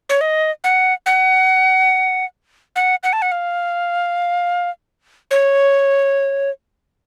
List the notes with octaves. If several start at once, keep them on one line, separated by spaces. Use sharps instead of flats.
C#5
D#5
F#5
F#5
F#5
F#5
A5
F#5
F5
C#5